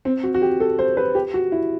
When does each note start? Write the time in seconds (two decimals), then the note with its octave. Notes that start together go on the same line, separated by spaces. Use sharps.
0.05 C4
0.24 F#4
0.34 F#4
0.42 G4
0.60 A4
0.79 C5
0.97 B4
1.15 G4
1.34 F#4
1.52 E4